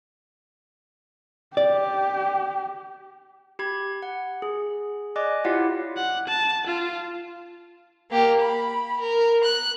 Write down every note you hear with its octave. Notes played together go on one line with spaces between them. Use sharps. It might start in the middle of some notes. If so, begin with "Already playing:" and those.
G4 D5
G4 B5 G#6
F#5
G#4
D5 D#5 G#5 D6 F#6
E4 F4 G4 C#5 F5 F#5
F#5
A5
F4
A#3 G4
B5
A#4
F#6